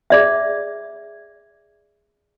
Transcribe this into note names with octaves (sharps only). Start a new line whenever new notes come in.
G#4 D5 E5